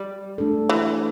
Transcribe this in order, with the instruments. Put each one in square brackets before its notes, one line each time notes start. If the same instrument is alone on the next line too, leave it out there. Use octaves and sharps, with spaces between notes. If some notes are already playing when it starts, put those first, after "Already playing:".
Already playing: [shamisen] G3
[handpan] A3 D4 A4
[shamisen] E3